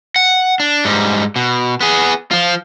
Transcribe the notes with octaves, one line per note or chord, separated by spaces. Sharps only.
F#5
D4
G#2 G3
B2
B3 G#4
F3 F4